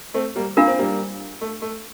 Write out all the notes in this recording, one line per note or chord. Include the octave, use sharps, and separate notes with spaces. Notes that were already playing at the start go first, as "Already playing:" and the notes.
A3 C4
G3 A#3
A#3 D4 F4 A#4 F5
C4
G3 A#3
A3
A3